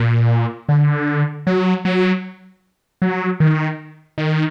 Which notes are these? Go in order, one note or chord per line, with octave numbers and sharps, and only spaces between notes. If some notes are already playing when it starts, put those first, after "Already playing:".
Already playing: A#2
D3
F#3
F#3
F#3
D#3
D#3